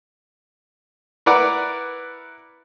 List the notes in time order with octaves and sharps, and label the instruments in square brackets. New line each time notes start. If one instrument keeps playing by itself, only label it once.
[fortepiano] E4 A#4 B4 D5 F#5